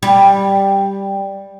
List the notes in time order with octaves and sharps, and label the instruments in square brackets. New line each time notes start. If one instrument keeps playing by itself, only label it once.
[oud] G3